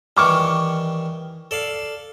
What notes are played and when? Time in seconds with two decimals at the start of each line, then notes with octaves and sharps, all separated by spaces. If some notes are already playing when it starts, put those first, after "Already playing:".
0.17 D#3 E3 G3 C#6 D6 F6
1.51 A4 D5 F5